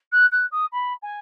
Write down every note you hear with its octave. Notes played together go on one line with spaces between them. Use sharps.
F#6
F#6
D#6
B5
G#5